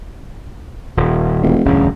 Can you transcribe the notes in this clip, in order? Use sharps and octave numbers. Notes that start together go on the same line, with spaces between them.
D#1
E1
E1 D2 G2 C#3